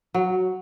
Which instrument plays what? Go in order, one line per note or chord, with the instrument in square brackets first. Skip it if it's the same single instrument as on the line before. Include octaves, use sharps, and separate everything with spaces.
[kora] F#3